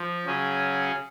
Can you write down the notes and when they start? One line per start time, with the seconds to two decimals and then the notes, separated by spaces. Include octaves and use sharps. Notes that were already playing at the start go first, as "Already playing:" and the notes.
Already playing: F3
0.25 C#3 F#3 C#4 G#4